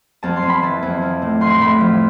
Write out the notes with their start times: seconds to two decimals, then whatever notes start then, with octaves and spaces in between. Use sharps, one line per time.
0.23 F2 A5
0.36 C6
0.42 F2
0.49 B5
0.62 E3 A5
0.83 F2
1.02 F3
1.22 A2
1.41 F3 C6
1.61 A2 B5
1.80 F3